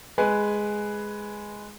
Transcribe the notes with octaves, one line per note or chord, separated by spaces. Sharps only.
G#3 B4 G#5